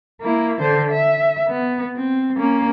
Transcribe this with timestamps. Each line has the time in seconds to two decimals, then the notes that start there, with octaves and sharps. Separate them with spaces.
0.22 A#3 E4
0.61 D3 C5
0.91 E5
1.48 B3
1.97 C4
2.36 A#3 C#4